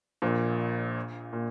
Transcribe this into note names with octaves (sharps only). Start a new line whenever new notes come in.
A#1 A#2
A#2